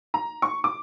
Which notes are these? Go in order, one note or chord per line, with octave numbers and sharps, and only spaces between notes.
A#5
C#6
D6